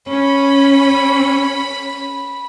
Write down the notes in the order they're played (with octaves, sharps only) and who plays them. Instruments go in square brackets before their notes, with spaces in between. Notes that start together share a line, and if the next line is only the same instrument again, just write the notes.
[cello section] C#4 [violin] B5